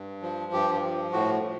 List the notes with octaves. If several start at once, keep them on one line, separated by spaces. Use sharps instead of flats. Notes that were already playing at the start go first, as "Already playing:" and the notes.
Already playing: G2
F3
G2 G4
F3
A2 F#4
A2